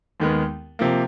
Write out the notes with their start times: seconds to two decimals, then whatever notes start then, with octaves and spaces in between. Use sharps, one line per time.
0.20 D#2 D#3 G#3 B3
0.79 C3 F3 A#3